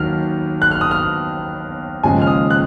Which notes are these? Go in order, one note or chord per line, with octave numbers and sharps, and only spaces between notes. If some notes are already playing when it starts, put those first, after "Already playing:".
Already playing: D#2 D#3 F#3 F6
F#6
F6
D#6
F6
D#2 C#3 F3 G#3 G#5
F6
D#6
F#6